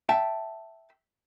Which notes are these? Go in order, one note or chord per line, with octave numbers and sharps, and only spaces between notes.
E5 G5 A5